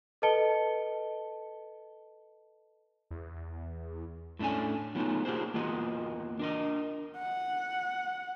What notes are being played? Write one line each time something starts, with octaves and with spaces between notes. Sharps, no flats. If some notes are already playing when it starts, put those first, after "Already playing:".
A4 B4 D#5 A5 C#7 G7
E2
A2 A3 C#4 D4 G#5
F#3 A3 B3 D#4 F4
A#3 D4 F4 G4 G#4 C5
E2 A#3 F4 F#4 D#5
D4 A#4 D#5
F#5